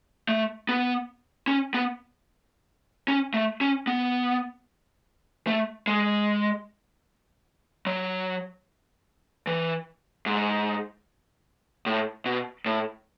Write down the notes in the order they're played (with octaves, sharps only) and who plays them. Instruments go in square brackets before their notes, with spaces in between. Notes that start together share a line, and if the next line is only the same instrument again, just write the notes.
[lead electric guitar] A3
B3
C#4
B3
C#4
A3
C#4
B3
A3
G#3
F#3
E3
G#2
A2
B2
A2